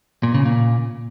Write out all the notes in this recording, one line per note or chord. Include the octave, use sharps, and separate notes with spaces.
A#2
C#3
A#2